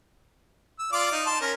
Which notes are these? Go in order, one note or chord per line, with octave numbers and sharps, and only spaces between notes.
E6
F4 D5 D6
D#4
A5 C6
C#4 A#4